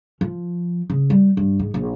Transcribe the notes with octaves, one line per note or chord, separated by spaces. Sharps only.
F3
C#3
G3
G2
G#2
A#1